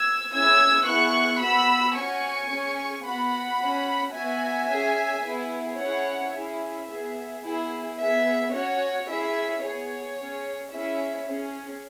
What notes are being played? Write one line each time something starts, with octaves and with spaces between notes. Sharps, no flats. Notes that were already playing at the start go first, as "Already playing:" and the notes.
Already playing: E6 G#6
C#4 E4 G#4 E6 G#6
B3 E4 G#4 C#6 F#6
B3 F#4 B5 E6
C#4 F#4 G#5 C#6
C#4 G#4
B3 F#4 F#5 B5
C#4 F#4
B3 F#4 E5 G#5
C#4 G#4
B3 E4 G#4
C#4 E4 G#4 C#5 F#5
C#4 E4 G#4 E5
B3 G#4
B3 E4 G#4
B3 G#4 E5
C#4 F#4 C#5
C#4 E4 G#4 E5
B3 G#4 C#5
C#4 G#4
C#4 E4 G#4 E5
C#4 G#4